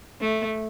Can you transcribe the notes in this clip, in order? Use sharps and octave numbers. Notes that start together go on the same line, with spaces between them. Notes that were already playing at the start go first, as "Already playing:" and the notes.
A3